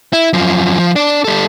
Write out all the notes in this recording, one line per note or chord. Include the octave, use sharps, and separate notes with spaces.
E4
F#2 F3
F3
D4 D5
G3 A4